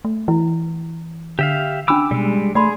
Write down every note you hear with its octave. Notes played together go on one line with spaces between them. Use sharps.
A3
E3 E4
D3 G4 E5 F5
C#4 D4 B5 D6 E6
B2 G3 G#3
A3 G#4 D5 B5 C6